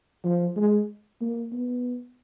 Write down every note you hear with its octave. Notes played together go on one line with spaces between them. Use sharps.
F3
G#3
A#3
B3